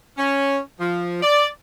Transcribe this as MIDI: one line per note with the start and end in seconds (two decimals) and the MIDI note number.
0.17 0.58 61
0.80 1.21 53
1.23 1.47 74